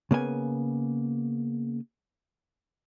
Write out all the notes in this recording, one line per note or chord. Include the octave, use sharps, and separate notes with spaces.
C#3 A#3 B3 G#5